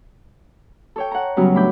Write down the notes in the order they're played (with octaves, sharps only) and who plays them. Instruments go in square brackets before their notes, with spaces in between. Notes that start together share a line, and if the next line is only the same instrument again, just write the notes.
[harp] A4 C#5 G5
F#5 A#5
C#3 F#3 G3 B3 C#4
A2 D4 B5 D6 G6